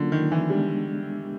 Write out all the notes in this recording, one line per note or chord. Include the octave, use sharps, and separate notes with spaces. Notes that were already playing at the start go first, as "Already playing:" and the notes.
Already playing: D3 F#3 A#3 C#4 F4
D#3
E3
G3 G#3 B3 D4